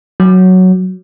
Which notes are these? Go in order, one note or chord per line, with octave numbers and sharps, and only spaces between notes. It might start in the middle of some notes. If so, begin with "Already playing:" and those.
F#3